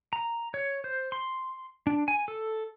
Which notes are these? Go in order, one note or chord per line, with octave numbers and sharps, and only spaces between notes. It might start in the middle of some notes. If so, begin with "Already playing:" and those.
A#5
C#5
C5
C6
D4
G#5
A4